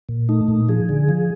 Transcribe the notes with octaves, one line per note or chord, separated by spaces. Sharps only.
A#2
A3 D#4
A#2
F3 G#4
D3
F3